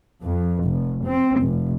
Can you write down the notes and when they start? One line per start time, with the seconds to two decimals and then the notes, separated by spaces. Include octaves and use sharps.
0.23 F2
0.64 F1
1.05 C4
1.41 F1